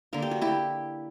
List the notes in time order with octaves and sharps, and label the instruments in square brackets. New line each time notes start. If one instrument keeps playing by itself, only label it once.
[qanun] D3 A#3 A#4
G4
F#4
E4 G4